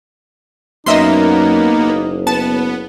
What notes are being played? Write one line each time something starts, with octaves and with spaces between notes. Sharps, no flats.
F#2 A#3 B3 D#4 D#5 E5 C6
F#1
B3 A5